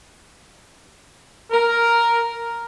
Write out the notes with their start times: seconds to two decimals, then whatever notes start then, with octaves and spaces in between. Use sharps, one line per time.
1.51 A#4